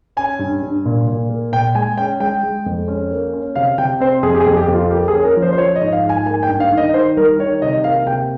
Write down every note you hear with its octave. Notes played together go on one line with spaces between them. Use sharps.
C#4 G#5
G2
G2
A#2
A#2
A#3
A#2 G5
G#3 G#5
C#4 G5
G#3 G5
G#3
F2
C#4
A#3
C#4
C3 F5
C3 G5
C4 C5
F2 G#4
G4
G#4
F2
G4
F2
F4
A#3 G4
G#4
C#4
A#4
F3
C5
C5
F3 C#5
D#5
G#2
F5
G#2 G#5
A#3 G#5
G5
G2
F5
D#3
D#5
D#3 C5
G3 A#4
D#3 C#5
C3 D#5
A#3 F5
C3 G5